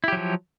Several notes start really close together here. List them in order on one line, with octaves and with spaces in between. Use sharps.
E4 G4 F#3 F3